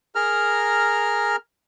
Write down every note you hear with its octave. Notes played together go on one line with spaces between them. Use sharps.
G#4 A#4 A#5 F6